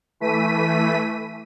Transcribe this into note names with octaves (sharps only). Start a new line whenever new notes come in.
E3 A3 B6 D#7